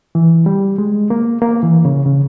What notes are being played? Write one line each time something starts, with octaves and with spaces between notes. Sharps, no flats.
E3
G3
G#3
A#3
A#3
E3
C#3
C#3